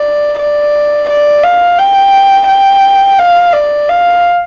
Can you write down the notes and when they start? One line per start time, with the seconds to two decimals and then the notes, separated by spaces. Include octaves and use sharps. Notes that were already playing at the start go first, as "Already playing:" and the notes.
Already playing: D5
0.39 D5
1.09 D5
1.43 F5
1.78 G5
2.48 G5
3.18 F5
3.53 D5
3.89 F5